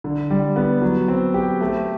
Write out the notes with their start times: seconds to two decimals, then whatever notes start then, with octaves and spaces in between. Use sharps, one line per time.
0.04 D3
0.30 G3
0.56 B3
0.82 F#3
1.08 C4
1.34 G4
1.61 A3